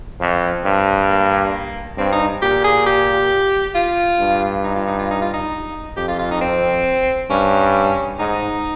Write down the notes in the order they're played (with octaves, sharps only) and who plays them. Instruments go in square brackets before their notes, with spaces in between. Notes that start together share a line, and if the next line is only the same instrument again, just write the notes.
[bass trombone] F2 [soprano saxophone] C4
[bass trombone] G2
[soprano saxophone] A#3
[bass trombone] G2 [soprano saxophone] C4
[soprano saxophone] D#4
[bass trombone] A#2 [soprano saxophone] G4
[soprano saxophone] G#4
G4
F4
[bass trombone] G2
[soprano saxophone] D#4
F4
D#4
F4
D#4
F4
D#4
[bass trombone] F2 [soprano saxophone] G4
[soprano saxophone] F4
F4
D#4
C4
[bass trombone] G2 [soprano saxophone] C#4
[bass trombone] G#2 [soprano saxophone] D#4